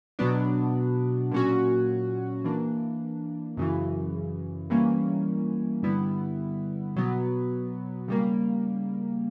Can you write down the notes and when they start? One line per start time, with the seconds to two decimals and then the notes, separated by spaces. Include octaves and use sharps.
0.19 B2 F#3 B3 D4
1.31 A#2 F#3 C#4 F#4
2.44 E3 A#3 D4
3.57 F#2 C#3 E3
4.70 E3 G3 A#3 C#4
5.82 G2 D3 G3 B3 E4
6.96 B2 F#3 B3
8.08 C#3 G3 A#3